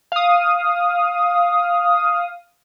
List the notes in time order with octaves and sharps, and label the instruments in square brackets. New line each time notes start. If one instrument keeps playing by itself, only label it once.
[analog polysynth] F5 D#6